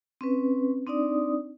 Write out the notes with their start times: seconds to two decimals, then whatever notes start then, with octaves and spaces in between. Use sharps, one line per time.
0.21 C4 C#4 B4
0.87 C4 D4 D#4 D5 D#6